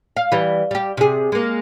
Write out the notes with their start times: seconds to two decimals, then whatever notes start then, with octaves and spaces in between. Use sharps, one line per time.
0.17 F5
0.32 E3 G3
0.71 G3 G4
0.97 C3 G#4
1.32 G#3 A#3